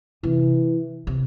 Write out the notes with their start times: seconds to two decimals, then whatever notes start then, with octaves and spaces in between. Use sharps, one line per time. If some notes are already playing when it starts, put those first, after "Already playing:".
0.23 C3 E3
1.07 C3